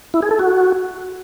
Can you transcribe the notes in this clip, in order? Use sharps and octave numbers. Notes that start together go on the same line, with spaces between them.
E4
G#4
A4
F#4